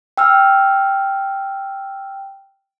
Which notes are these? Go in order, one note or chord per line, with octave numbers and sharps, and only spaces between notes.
G5 E6 F6